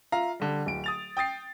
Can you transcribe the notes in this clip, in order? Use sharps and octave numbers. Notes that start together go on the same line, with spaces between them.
F4 E5 F5 A#5
D3 G3
D1 D7
D#6 A6 F7
G5 D#6 A6 C7